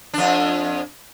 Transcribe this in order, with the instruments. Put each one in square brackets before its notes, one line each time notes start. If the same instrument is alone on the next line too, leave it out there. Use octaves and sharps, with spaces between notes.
[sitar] F2 D4